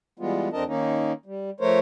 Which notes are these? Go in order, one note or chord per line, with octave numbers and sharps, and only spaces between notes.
E3 G3 G#3 B3 F4
F2 C4 D4 A#4 D#5 A5
D#3 A#3 C#4 D#4
G3
F3 A3 A#4 C5 C#5